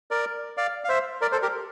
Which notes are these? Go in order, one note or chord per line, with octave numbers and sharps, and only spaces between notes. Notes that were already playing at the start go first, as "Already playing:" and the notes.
A#4 D5
D5 F5
F5
C5 E5
A#4 D5
A4 C5
G4 A#4